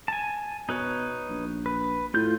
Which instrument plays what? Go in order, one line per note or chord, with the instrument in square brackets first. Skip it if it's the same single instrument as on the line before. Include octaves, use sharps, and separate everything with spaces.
[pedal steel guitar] G#5 A5
[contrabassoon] B2 [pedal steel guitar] D#4 B4 C#5
[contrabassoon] A#1
[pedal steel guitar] B4
[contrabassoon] A2 [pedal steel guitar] F4 G6